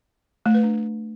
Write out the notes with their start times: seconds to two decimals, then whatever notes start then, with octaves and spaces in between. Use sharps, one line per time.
0.46 A3
0.54 B4
0.63 D4